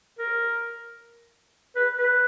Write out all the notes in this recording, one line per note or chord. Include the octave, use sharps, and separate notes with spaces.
A#4
B4
B4